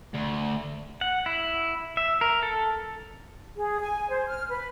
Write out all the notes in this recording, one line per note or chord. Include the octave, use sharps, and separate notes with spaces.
D2
F#5
E4
E5
A#4
A4
G#4
G#5
C5
F6
B4